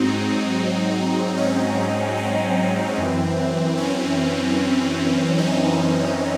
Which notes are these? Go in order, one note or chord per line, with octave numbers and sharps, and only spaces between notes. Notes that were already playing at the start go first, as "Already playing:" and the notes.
Already playing: G#2 F#3 C4 D#4
C#4
C4
F#2 E3
C#4
C4 D#4